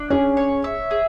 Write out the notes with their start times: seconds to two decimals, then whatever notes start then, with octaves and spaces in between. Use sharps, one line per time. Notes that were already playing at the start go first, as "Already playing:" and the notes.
Already playing: D4
0.10 C#4 G#4
0.37 C#5
0.64 E5
0.91 G#4